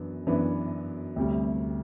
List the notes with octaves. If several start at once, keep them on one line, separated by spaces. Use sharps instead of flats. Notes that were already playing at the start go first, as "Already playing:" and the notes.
Already playing: F#2 E3 B3 D4
F#2 E3 B3 D4
D2 C3 G3